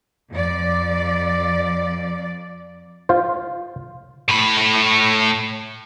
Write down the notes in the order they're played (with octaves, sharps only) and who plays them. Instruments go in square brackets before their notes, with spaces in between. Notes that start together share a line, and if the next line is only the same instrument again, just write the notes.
[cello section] F2 D5
[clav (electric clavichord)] F4 C5
[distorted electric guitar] A2 B5